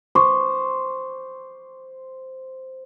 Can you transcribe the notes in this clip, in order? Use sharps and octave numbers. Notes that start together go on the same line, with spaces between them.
C5 C#6 D6